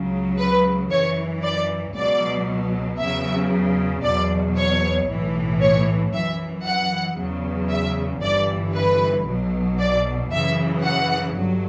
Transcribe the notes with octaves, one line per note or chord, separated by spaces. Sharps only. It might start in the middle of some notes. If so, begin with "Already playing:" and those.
Already playing: C#2 C#3 F#3
B4
F#2 E3 C#5
D5
C#2 B2 F#3 D5
E2 C#3 F#3 E5
E2 B2 F#3 D5
C#5
B1 A2 E3
C#5
F#2 E3 E5
F#5
E2 C#3 F#3
E5
G1 G2 E3 D5
B4
B1 B2 F#3
D5
F#2 C#3 E3 E5
F#5
G1 G2 F#3